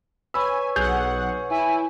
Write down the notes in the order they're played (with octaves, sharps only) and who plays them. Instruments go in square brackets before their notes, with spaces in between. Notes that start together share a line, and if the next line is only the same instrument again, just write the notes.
[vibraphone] B4 C#5 C#6 [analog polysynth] G#5 [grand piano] B5 E6
[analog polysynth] B1 F#5 [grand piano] G#4 G6 F7
[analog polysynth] E4 [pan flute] G#5